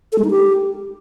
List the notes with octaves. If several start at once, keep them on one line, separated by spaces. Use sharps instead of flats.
A4
G#3
D#4
G4